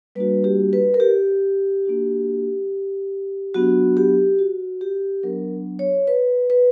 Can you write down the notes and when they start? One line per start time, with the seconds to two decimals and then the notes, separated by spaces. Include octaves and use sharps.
0.15 G3 A#3 D4 F#4 B4
0.44 G4
0.73 B4
0.94 A#4
1.00 G4
1.85 A#3 D4 F#4
3.54 F#3 B3 D4 F#4
3.97 G4
4.39 F#4
4.81 G4
5.23 F#3 B3 D4 A#4
5.79 C#5
6.07 B4
6.50 B4